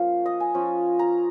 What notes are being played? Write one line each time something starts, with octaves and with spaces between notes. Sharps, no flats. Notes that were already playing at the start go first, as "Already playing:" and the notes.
Already playing: F3 A#3 C#4 F4 F5
D#5
G#5
F3 C#4 F4
A#5